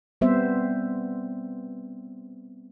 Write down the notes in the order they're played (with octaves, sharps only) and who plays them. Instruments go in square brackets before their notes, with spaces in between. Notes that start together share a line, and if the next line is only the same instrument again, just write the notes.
[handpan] G3 B3 C4 C5 E5